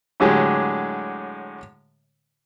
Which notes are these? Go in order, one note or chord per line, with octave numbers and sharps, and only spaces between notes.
A2 D3 F#3 G#3 G4